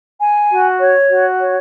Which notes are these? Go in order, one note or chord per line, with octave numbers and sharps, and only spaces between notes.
G#5
F#4
C#5
F#4
C#5